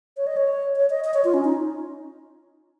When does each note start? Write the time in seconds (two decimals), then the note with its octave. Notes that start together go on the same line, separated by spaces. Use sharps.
0.17 C#5
0.27 D#5
0.37 C#5
0.76 C#5
0.90 D#5
1.04 D#5
1.14 C#5
1.24 F4
1.34 C#4
1.44 D#4